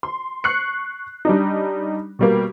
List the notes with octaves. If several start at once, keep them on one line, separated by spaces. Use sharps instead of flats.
C6
C#6 F#6 C7 C#7
G3 D4 D#4
B2 G3 A#3